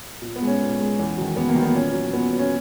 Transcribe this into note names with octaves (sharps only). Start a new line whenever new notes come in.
A#2
B3
G#3
C#4
A#2
G#3
E2
D#3 F#3
E2 B3
A#3
D#3 F#3
B3
A#2 C#4
F#3
A#2 B3
F#3
C#4